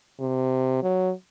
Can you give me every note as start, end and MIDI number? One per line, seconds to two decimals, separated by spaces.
0.20 0.80 48
0.82 1.11 54